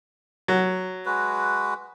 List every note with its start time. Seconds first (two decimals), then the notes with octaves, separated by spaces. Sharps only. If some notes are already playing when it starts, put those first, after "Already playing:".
0.48 F#3
1.06 G#3 F#4 B4